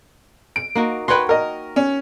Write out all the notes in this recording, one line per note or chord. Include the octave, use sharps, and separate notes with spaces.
D7
A#3 D#4 F#4
F#4 B4 C#5 G5 C6
A#4 D#5
C#4